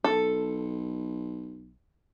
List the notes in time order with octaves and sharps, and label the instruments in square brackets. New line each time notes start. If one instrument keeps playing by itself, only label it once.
[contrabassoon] B1 [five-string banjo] A4